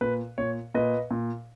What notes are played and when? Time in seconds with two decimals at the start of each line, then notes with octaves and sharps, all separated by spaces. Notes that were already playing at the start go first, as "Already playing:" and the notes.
0.01 A#2 B4
0.38 A#2 C#5
0.75 A#2 B4 D#5
1.11 A#2